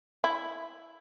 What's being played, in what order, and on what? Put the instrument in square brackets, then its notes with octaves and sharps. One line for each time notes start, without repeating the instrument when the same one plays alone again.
[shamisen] E4